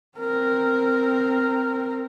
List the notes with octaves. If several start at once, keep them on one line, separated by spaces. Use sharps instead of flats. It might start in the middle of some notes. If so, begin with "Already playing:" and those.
C4 A#4